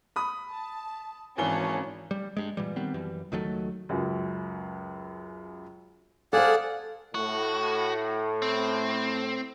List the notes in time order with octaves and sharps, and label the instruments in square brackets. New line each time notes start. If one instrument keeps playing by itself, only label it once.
[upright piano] B5 D#6
[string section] A5
[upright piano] G#1 E3 G7 [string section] C#4 A5
[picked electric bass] G3
G2 G#3
A#2 E3 G3
D#3 G3 B3 C4
F#2 E3 G3
C#2 D#3 F#3 A3
[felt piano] C#2 F#2
[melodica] G#4 D5 F#5 [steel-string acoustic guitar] A4 C5 [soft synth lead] F5
[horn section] A2 [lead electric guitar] F#4
[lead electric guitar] C4